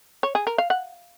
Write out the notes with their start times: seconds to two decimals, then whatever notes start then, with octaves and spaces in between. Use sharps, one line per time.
0.23 C#5
0.35 G#4
0.47 A#4
0.58 F5
0.70 F#5